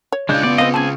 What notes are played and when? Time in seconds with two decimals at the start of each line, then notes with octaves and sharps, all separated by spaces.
0.12 C#5
0.29 C#3 G#3 D4 F4 G6
0.43 B3 D5
0.58 C4 B4 D#5 F5
0.74 C4 C#4 G#4 G#5 A5